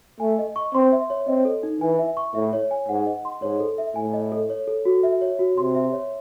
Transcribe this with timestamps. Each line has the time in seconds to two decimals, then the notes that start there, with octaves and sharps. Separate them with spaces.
0.20 A3 G#5
0.39 D#5
0.56 C#6
0.74 C4 C6
0.92 E5
1.10 C#5
1.27 C4 D#5
1.45 A4
1.63 D#4
1.81 E3 G#5
1.99 E5
2.17 C#6
2.35 A2 E5
2.53 C#5
2.71 G#5
2.88 G#2 F#5
3.06 D#5
3.25 C6
3.42 G#2 C#5
3.60 A4
3.78 E5
3.96 A2 G#5
4.14 D#5
4.32 A4
4.50 C#5
4.68 A4
4.85 F#4
5.03 E5
5.21 C#5
5.39 F#4
5.57 C3 C6
5.75 E5
5.93 C#5